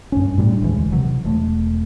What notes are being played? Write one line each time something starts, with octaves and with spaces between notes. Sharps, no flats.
G2 C#4
A2 G3 C#4 D4
E1 D2 E3 G#3
C3 E3 F#3
E1 A3